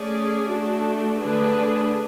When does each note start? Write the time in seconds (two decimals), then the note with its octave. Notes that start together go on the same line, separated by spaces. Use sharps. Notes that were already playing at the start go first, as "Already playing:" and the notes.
Already playing: A3 C#4 G#4 D5
0.50 A3 D4 F#4
1.18 D3 A3 D4 G#4 B4